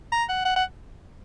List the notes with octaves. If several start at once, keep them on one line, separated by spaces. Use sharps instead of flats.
A#5
F#5
F#5
F#5